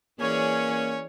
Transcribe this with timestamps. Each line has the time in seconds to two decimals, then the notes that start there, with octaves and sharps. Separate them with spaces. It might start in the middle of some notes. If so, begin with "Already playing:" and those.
0.20 E3 A#3 C#4 G#4 C#5 D5